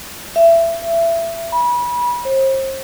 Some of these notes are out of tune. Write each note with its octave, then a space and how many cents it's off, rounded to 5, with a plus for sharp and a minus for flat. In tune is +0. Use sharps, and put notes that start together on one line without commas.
E5 +25
B5 -30
C5 +35